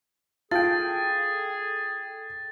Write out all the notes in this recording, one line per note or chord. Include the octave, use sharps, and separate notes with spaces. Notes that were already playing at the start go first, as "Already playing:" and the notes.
F4 G#4 A4 G5 A6